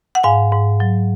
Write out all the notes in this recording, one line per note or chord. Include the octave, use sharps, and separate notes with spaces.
F#5
G#2 F5 G#5
G#2
F#3